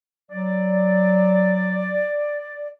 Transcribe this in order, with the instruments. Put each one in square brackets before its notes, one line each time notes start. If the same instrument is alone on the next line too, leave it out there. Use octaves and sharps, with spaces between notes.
[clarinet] F#3 [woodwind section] D5